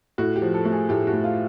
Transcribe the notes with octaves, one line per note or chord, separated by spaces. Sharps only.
A2 F#4
G4
F3
A4
A3
G#4
A2 G4
F#4
A2
F4